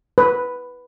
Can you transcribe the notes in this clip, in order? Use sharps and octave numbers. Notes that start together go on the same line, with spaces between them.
B4